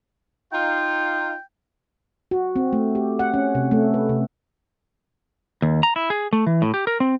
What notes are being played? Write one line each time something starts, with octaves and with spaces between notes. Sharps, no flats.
D#4 F4 G5
F#4
C4
A3
G4
F#5
C#4
C3
A3
B4
C3
D#2
A#5
E4
G#4
A3
E3
A2
G4
A#4
C4